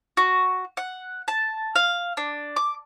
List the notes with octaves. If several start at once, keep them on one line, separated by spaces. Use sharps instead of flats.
F#4
F#5
A5
F5
D4
D6